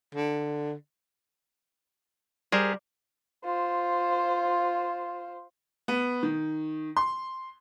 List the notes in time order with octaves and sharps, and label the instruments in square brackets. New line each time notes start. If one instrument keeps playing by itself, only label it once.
[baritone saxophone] D3
[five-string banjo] G3 [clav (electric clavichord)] G#4 A#4 C5
[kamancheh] F4 C5
[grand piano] B3
D#3
C6